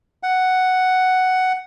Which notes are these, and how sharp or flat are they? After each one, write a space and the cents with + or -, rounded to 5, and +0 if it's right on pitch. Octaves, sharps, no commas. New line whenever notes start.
F#5 +5